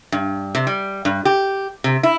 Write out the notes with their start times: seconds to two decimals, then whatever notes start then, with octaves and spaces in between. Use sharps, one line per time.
0.12 G2
0.55 C3
0.67 G3
1.05 G2
1.25 G4
1.84 C3
2.03 E4